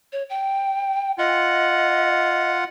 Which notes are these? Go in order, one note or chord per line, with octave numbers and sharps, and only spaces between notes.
C#5
G5
F4 D#5 F#5